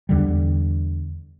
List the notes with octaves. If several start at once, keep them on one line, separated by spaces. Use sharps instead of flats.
E2 D3 G3